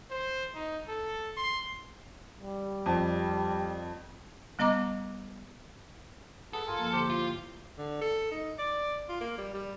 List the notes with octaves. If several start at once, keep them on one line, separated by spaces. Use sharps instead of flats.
C5
D#4
A4
C6
G3
F2
G3 B3 D#5 A#5 D6
G#4 A4 B4 F#5
G2 F4 A#4 G#5
F3 A#3
D3 A#3 E4 G4 C5
F4
D3
A4
D#4
D5
F4
A#3
G3
G3